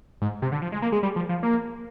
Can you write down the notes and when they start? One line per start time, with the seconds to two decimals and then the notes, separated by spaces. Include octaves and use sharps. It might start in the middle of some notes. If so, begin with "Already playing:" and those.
0.22 G#2
0.42 C3
0.52 D3
0.62 F3
0.72 G#3
0.82 A#3
0.92 G#3
1.03 G3
1.16 F3
1.29 F3
1.43 A#3